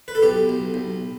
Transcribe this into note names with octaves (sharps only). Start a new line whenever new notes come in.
B4
A4
B1 G4
B1
B1